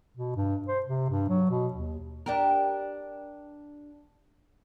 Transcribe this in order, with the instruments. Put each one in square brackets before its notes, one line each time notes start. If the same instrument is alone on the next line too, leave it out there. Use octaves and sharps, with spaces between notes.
[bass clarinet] B2
G2
C5
C3
G2
F#3
B2
D#2
[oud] D4 G4 A#4